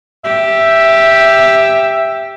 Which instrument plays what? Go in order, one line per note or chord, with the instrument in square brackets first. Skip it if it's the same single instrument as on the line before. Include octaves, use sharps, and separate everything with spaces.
[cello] G4 [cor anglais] E5